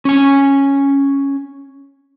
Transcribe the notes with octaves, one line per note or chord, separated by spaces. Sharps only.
C#4 G#5